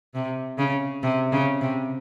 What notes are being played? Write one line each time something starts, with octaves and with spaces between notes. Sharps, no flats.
C3
C#3
C3
C#3
C3